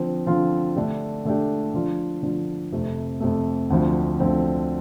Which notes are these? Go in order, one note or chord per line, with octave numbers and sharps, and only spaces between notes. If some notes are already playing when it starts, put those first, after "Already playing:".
Already playing: D3 F3 C4 F4
D3 F3 C4 F4
D3 A3 D4 G4
D3 A3 D4 G4
D3 F3 D4 F4
D3 F3 D4 F4
F2 C3 A3
F2 C3 A3
D2 D3 F3 C4
D2 D3 F3 C4